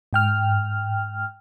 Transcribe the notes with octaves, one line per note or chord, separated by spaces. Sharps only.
G#2 G5 F6